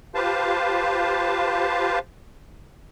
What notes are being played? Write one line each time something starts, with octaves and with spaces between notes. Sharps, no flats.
F4 G4 B4 C5 F5 A5